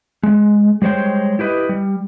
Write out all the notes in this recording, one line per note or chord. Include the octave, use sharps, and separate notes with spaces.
G#3
G3 G#3 C5 C#5 G5
E4 G4 B4 D#5
G3